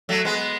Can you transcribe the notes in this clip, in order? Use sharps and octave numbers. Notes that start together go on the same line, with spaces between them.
F#3 A3
G#3 B3